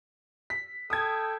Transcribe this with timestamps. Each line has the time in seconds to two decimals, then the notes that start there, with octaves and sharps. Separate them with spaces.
0.50 B6
0.90 A4 G5 D#6 G#6